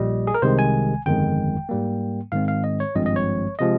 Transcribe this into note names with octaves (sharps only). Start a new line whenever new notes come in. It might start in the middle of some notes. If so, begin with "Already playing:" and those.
Already playing: A#1 A#2 G3 D#5
G#4
A#4
C2 C3 D#3 G#3 C5
G#5
G1 F2 D#3 G#3 G5
G#2 G3 A#3
G#2 D#3 G#3 C4 F5
F5
D#5
C#5
G#1 G2 F3 G#3 C4 D#5
D#5
C#5
C3 F3 G#3 D#5